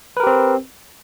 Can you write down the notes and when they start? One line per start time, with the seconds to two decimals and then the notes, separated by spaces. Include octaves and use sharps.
0.17 B4
0.20 A#4
0.23 G4
0.27 C4